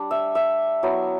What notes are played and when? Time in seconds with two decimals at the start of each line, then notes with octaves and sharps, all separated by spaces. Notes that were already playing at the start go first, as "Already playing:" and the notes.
Already playing: G3 D4
0.11 E5
0.35 E5
0.83 F#3 B3 E4